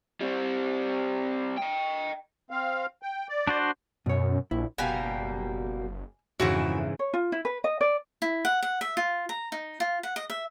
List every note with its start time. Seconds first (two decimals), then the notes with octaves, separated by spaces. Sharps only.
0.21 G3 C4
1.57 D#5 G5
2.51 C4 F5
3.03 G5
3.29 D5
3.47 D4 F#4 C5
4.06 F#2 B2 C#5
4.51 A#1 E4
4.78 F#1 B2 G3 A#3 G#5
6.40 F2 G#2 C#3 E3 E4 F#4
6.99 C#5
7.14 F4
7.32 E4
7.45 B4
7.64 D#5
7.81 D5
8.22 E4
8.45 F#5
8.63 F#5
8.81 E5
8.97 F4
9.29 A#5
9.52 D#4
9.80 F4
10.03 F#5
10.16 D#5
10.30 E5